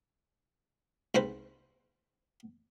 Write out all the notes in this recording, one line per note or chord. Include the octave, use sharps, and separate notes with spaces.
C2 G#2 B4 C5